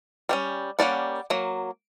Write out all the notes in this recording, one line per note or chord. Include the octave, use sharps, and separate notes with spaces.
G3 A#3 C#4
G3 A#3 C#4 D5 F#5
F#3 A#3